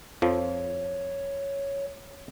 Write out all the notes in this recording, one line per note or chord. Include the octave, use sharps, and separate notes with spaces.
F2 F3 C#5